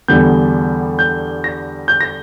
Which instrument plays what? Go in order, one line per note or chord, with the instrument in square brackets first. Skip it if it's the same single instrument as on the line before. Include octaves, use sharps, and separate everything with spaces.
[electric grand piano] E2 D3 G3 B3 G6
G6
A#6
G6
A#6